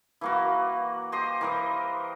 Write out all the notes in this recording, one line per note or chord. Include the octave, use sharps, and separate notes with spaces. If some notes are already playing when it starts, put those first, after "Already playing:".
E3 A#3 F#4
G4 C5 D#5 C6
E3 A#4 D#5